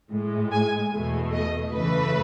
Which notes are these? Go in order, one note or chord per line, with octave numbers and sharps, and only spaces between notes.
A2 G#3
G#5
E2 B2 A3
D#5
F#2 C#3 E3 A3 B4